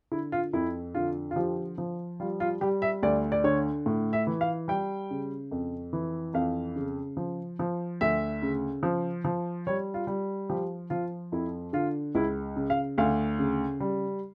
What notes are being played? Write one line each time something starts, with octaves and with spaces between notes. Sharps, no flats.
D3 E4
F4
F2 E4
D3 F4
F4
F3 G4
F3
G3 F4
F4
G3 G4
E5
D2 D5
D5
D3 C#5
A2
E5
E3
F5
G3 G5
C#3
F2
E3
F2 F5
C#3
F3
F3
D2 E5
C#3
F3
F3
G3 C#5
F4
G3
F3 G4
F3 F4
F2 E4
D3 F4
C#2 E4
C#3
F5
D2 F5
C#3
G3